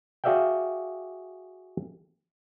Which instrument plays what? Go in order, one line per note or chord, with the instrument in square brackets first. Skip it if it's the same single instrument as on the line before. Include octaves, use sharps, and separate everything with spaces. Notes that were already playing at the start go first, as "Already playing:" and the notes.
[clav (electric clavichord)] F#4 G#4 D5 E5 F5 G5